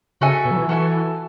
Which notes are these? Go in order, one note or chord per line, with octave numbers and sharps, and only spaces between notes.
C#3 F#4 A4 E5 G#5
B2
F#3
E3
E3 F#4 A4 E5 G#5